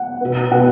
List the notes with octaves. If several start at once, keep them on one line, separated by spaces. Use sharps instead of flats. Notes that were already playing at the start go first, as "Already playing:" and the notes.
Already playing: F#5
B2 B3
B2 B3 F#5